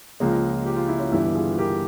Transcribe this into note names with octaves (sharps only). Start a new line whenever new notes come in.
C#2 C#3 F3 G#3 A#3
G4
F4
E4
C#4 F4
G1 G2 E3 G3 E4 G4
F4 G#4
G4 A#4